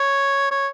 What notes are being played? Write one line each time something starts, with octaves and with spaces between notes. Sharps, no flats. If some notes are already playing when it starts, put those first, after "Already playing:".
Already playing: C#5
C#5